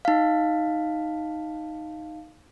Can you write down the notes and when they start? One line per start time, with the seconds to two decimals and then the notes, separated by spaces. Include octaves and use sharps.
0.05 D#4 F5